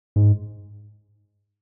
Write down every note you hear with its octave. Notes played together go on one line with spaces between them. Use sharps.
G#2